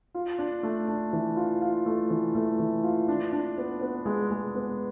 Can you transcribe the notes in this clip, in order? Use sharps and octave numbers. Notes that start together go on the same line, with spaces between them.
F4
D4
A3
D4
E3
F4
F4
A3
E3
A3
E3
F4
D4
D4
B3
B3
G#3
G#3
B3